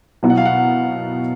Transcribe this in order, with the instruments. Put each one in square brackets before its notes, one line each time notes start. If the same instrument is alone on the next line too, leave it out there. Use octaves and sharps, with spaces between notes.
[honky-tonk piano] B2 F#3 B3 E4
[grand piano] F#5
F5
F#5